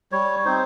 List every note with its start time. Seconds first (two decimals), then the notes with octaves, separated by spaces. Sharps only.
0.12 G3 C#5
0.45 C4 D#4 C5